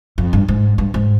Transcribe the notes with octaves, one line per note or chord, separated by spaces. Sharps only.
F2
G2
G#2
G2
G#2